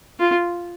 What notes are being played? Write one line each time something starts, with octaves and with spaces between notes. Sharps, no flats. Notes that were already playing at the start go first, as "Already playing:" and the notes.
F4